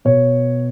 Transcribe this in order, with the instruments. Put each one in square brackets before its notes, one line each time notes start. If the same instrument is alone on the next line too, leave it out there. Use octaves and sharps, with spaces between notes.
[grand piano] B2 C#5